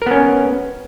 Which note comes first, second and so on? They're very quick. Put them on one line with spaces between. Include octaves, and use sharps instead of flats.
A#4 B3 C#4